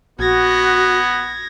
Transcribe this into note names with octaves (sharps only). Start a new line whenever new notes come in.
A#1 B3 F#4 G#6 A#6